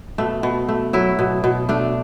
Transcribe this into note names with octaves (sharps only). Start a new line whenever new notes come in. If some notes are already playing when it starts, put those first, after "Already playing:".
B2 A3
B2
A3
F#3 E4
B2
B2
A3 D4